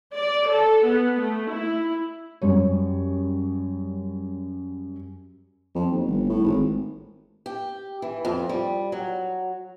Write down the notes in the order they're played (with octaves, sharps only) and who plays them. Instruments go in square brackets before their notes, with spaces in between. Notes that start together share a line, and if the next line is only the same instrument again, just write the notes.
[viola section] D5
A4
B3
A3
E4
[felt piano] F#2 G3 C#5
[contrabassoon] F2
D#2
G1
A2
G#1
[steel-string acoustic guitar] G4
E3
F2
G3
F#3